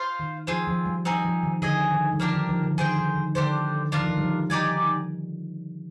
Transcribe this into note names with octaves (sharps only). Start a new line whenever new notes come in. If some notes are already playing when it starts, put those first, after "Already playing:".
Already playing: F4 C5 F5
D#3
F3 C4 F4 G#4
F3
G3
F3 C4 D#4 G#4
F3
D#3
D3 G#4 D#5 G#5
D#3
G3
F3 A#3 D4 G4 A#4
D#3
F3
D3
D#3 G#4 C5 G5
D#3
D#3
D3 D4 G4 C5
D#3 D4 F4 A#4
F3
D#3
G3
F3
G3 D#4 G4 D5 G#5